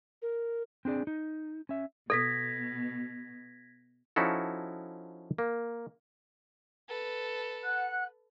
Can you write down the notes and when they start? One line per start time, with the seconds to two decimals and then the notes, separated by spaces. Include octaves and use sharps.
0.22 A#4
0.85 C4 D4 G#4 D5
1.07 D#4
1.69 C#4 E5
2.10 B2 A4 G#6 A#6 B6
4.16 F3 C#4 D#4 E4 F#4 A4
5.38 A#3
6.89 A4 B4
7.64 F#5 F#6